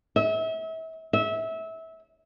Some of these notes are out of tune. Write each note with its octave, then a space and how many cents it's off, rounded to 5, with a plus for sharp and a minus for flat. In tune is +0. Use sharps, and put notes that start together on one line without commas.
E5 -35
E5 -25